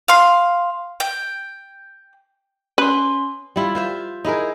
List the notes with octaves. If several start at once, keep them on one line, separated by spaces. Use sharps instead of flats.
F5 C6
G5
C#4 B4 C6
G3 E4 F4
F4 C5 E5
D#4 E4 G#4 A#4